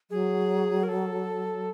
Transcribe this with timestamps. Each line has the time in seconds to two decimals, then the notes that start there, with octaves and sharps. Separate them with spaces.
0.11 F#3 G#4
0.83 A#4
0.88 A4